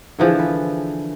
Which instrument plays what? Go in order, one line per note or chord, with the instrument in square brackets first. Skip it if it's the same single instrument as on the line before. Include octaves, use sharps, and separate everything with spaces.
[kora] D3 E3 F3 G#4
B4